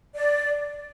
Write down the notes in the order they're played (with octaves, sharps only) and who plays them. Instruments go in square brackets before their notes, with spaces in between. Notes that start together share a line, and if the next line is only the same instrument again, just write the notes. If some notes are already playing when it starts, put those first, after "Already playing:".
[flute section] D5